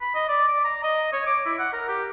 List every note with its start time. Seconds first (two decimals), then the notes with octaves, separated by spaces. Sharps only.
0.01 B5
0.15 D#5
0.29 D5
0.48 D6
0.65 A#5
0.83 D#5
1.13 C#5
1.26 D6
1.46 E4
1.59 F#5
1.73 A#4
1.88 G4